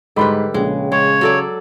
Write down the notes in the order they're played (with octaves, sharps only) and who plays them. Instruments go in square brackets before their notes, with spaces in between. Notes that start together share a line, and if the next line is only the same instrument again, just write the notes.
[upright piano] G#2 B5 C6 [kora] D3 G3 B4
[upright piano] A#1 [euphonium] C#3 [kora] G#3
[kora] G#3 [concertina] C#5
[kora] F#3 A4 D5